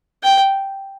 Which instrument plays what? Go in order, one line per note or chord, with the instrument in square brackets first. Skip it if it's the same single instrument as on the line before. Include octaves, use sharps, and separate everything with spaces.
[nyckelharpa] G5